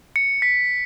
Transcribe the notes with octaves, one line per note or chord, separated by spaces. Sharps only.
C#7
B6